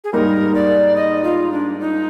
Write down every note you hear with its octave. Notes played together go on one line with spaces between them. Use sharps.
G#4
G#2 G3 A#3 D#4 A#4
D5
D#5
F4
D4
D#4